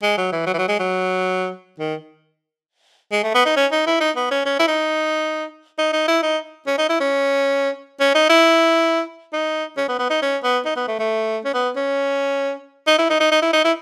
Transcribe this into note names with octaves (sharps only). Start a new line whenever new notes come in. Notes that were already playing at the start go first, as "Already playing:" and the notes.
G#3
F#3
E3
F#3
E3
F#3
G#3
F#3
D#3
G#3
A3
B3
D#4
C#4
D#4
E4
D#4
B3
C#4
C#4
E4
D#4
D#4
D#4
E4
D#4
C#4
D#4
E4
C#4
C#4
D#4
E4
D#4
C#4
B3
B3
D#4
C#4
B3
D#4
B3
A3
A3
C#4
B3
C#4
D#4
E4
D#4
D#4
D#4
E4
D#4
E4